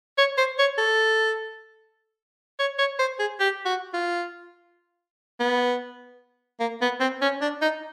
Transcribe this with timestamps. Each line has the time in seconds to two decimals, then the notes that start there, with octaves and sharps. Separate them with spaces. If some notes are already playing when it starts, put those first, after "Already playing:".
0.18 C#5
0.37 C5
0.59 C#5
0.78 A4
2.59 C#5
2.78 C#5
2.99 C5
3.19 G#4
3.40 G4
3.65 F#4
3.93 F4
5.40 B3
6.60 A#3
6.81 B3
7.00 C4
7.22 C#4
7.41 D4
7.62 D#4